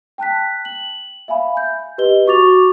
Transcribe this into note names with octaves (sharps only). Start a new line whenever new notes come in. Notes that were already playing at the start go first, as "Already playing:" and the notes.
G5 A5 F#6 B6
F#7
E5 F5 G#5 B5
G6
G4 B4 D#5 G7
F#4 C#6 D6 A6 F7